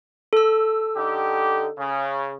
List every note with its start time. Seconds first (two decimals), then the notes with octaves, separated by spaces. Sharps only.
0.33 A4 E6
0.96 D3 D#4 G4
1.78 C#3